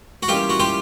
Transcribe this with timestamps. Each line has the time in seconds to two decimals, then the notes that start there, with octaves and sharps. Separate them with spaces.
0.23 F#4
0.28 E3 G3 A#3 C#4 E4 F4 G4
0.49 F#4
0.60 F4 G4